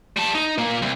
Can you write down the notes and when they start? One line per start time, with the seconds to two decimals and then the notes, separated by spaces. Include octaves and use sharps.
0.17 G3 A5
0.34 D#4
0.58 A#2 A#3
0.82 C2